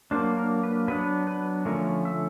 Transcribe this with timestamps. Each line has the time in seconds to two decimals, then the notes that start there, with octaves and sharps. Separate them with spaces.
0.11 F#3 A#3 D4 C5
0.37 A#4
0.63 B4
0.88 F#3 B3 D4 B4
1.27 B4
1.65 D3 F3 A3 C#4 A#4
2.05 E5